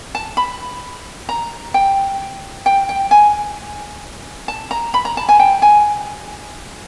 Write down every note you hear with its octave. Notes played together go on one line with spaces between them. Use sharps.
A5
B5
A#5
G5
G5
G5
G#5
A5
A#5
B5
A#5
A5
G#5
G5
G#5